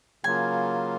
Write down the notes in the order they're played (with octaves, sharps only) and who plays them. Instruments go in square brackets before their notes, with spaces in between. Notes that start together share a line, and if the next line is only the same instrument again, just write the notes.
[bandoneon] C#3 F#3 A#3 F4 [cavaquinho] G#5